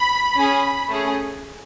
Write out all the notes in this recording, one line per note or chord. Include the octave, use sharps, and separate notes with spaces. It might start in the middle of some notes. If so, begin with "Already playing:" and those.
Already playing: B5
C#4 G#4
A3 C#4 G#4